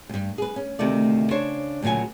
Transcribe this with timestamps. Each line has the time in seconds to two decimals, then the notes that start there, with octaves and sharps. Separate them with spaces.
0.09 D2 G2
0.38 G#4 B4
0.56 C#4
0.79 D2 C3 D#3 A3 D5
1.31 C#3 D4 C5 C#5
1.82 D2 A#2 C#3 F#3 G#5